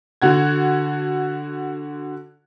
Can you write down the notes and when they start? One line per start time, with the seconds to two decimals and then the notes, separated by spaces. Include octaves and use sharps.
0.22 D3 F#4 G#6